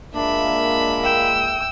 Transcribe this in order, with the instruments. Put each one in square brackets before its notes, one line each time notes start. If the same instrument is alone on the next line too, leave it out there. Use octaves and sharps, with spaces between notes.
[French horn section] A#2 G#3 A#3 [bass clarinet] D4 [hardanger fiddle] E5 B5
[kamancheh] G5 E6